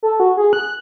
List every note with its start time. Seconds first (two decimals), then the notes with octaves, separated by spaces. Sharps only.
0.03 A4
0.20 F#4
0.37 G#4
0.53 F#6